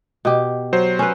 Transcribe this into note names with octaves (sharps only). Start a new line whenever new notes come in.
B2 G4
F#3 C5
C#4 B4